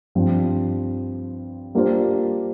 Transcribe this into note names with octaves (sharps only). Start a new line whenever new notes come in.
G2 F3 C4
G3 A#3 D4 F4 C5